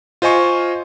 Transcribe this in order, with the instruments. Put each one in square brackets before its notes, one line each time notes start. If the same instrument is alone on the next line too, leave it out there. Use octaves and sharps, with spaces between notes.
[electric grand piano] F4 C5 D#5 G#5 C#6